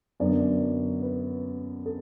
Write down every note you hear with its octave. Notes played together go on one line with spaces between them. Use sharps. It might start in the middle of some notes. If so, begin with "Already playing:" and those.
F#2 D3 F#3 B3 D5
B4
A4